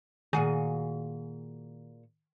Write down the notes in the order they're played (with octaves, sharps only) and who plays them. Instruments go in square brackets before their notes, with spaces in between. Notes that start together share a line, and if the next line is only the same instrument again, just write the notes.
[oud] A#2 F#4 G#4 [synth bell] D#3